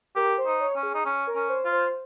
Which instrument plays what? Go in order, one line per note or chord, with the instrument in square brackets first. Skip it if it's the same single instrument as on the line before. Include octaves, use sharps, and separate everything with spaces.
[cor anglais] G4 [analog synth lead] A#4
[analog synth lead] C5
[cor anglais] D#4
[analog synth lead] C#5
[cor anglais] C#4
[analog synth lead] G#4
[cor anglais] D#4
C#4
[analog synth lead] A#4
[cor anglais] C#4
[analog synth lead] C5
[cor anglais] F4
[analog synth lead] C5